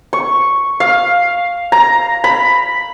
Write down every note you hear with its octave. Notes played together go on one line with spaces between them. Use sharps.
C#6
F5
A#5
B5